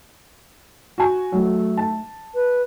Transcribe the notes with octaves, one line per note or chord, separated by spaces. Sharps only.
F#4 G#5
F#3 A3
A5
B4